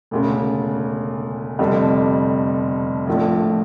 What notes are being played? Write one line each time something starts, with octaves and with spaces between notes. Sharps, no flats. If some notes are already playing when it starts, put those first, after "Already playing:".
E1 D2 C#3
F1 F2 D3 G3
A#1 A2 F3 A3 D4